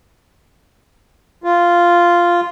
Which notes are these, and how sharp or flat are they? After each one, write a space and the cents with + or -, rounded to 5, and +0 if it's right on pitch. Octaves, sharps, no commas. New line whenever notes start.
F4 -5